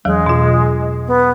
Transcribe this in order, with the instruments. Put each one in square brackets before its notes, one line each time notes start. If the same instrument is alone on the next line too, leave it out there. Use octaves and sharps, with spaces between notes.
[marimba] E2 E3 F#3 [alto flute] G#3
[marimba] B2 F4
[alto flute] B3